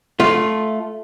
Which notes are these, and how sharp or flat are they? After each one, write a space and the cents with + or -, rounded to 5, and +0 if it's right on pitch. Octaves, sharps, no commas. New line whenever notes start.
A3 -10 F4 +0